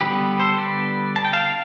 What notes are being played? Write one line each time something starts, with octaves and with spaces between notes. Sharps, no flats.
D3 G3 B3 G4 B4
A4 C5
B4 D5
A5
G5
F5 A5